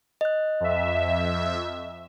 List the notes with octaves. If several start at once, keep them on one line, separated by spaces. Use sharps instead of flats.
D#5 F#6
F2 E5